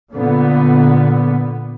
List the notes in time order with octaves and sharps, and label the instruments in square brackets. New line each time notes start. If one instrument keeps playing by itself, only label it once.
[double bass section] A#2 D3 B3